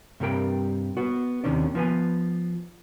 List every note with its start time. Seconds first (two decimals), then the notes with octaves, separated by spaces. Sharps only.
0.20 G2 C3 G3 A#4 G5
0.97 B3 F#4
1.44 D#2 C3 D#3 C#4 D4
1.75 F3 B3 B4 G#5